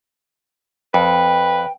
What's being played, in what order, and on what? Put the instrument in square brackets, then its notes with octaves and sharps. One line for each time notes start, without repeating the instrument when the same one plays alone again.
[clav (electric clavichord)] F2 [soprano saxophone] B4 [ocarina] G5